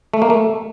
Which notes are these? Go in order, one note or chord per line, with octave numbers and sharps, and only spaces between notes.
A3
A#3
A3